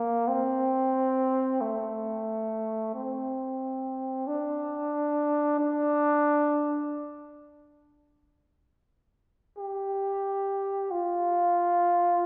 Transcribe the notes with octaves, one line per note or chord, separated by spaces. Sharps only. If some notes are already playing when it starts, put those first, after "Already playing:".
Already playing: A#3
C4
A3
C4
D4
D4
G4
F4